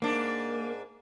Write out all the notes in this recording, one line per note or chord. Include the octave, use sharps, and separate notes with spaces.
G#2 A#3 D4